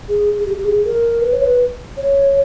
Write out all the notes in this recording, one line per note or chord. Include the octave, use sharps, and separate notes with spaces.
G#4
G#4
G4
G4
G#4
A#4
B4
C#5
B4
C#5